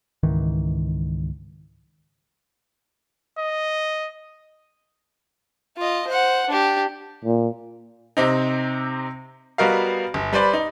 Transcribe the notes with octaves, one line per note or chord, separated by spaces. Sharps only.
C#2 G#2 D#3 E3
D#5
F4 D#5
C5 F#5
D4 G4
A#2
C3 C4 D#4
G3 B3 F#4 A#4 D#5 F5
G1
G3 B4 C5 D5
D#4